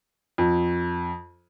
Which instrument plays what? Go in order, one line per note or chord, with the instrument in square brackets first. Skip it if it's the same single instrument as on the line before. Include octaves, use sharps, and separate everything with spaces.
[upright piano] F2